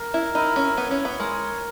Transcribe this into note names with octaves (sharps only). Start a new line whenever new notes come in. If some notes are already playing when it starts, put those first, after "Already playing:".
Already playing: A#4
E4
D#4 E4
C#4
B3 C#5
C#4
B3
G#3 A#4